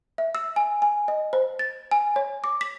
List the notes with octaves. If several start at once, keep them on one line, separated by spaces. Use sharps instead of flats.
E5
E6
G#5
G#5
D#5
C5
A6
G#5
C#5
D6
B6